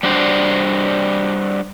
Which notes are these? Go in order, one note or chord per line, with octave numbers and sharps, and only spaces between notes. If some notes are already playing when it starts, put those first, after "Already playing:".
G3 D4 F#4 C5